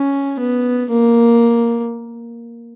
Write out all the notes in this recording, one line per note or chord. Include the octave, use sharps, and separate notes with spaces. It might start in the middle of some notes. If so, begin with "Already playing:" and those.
Already playing: C#4
B3
A#3